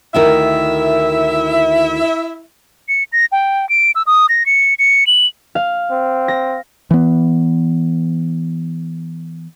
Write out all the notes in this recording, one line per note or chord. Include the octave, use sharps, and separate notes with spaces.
D2 D#3 E4 A#4 E5
C#7
A#6
G5
D7
E6
D#6
A#6
C#7
C#7
F#7
F5
C4
A#6
E3 B3